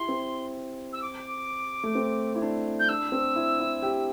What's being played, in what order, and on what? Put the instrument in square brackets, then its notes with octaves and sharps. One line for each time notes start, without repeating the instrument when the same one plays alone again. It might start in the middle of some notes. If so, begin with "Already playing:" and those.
Already playing: [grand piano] E4 G4 [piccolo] C6
[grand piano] C4
[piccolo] E6
D6
[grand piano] A3
C4
E4
D4
[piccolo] G6
[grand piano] D4 [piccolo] E6
[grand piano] C4
E4
E4
G4